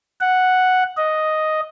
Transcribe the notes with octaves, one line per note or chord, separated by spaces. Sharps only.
F#5
D#5